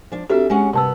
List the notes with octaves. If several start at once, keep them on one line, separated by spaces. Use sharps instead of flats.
F3 D4
C4 D4 F#4 G4 A4 E5
G#3 C#4 F#5
G2 C3 B3 A5 E6